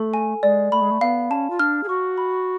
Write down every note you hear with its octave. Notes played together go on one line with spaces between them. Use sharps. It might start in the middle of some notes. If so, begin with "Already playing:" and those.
Already playing: A3 A4
G#5
G#3 D5
A3 B5
G#3
A3
B3 F5
C#4 A5
F4
D4 F6
G#4
F#4 C#6
B5